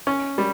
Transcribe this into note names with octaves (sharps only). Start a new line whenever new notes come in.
C#4
G3